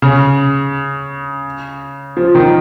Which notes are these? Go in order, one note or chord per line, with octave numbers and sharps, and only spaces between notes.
C#3
F3
D#3